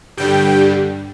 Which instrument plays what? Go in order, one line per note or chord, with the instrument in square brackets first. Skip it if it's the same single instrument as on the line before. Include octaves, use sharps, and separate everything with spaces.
[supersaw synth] G2 D3 G3 G5